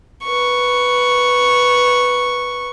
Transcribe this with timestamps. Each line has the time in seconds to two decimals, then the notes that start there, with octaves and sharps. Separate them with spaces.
0.24 B4 C#6